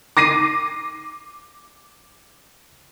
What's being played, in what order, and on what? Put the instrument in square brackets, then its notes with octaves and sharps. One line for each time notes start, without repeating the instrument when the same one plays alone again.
[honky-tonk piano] D6 A#6 C7 D#7